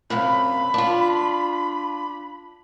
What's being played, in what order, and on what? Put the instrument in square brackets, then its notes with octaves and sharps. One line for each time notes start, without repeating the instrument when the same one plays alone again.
[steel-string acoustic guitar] F#2 C3 F5 [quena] B5
[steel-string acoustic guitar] D4 F4